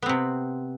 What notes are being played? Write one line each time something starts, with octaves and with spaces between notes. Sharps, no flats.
C3 B3 C4